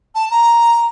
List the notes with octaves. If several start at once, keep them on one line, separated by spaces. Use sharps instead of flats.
A5
A#5